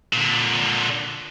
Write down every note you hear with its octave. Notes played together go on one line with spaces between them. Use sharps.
A#2 D3